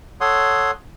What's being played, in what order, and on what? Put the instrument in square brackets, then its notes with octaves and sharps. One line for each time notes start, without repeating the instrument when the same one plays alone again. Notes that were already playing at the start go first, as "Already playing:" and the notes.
[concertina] A4 C#5 F#5 C6 D#6